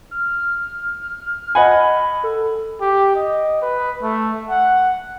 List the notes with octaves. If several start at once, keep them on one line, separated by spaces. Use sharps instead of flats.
F6
D#5 F#5 G#5 B5
A4
G4
D#5
B4
A3
F#5